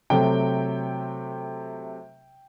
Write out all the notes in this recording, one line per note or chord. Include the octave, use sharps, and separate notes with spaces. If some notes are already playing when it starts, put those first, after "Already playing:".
C3 F#3 A3 G5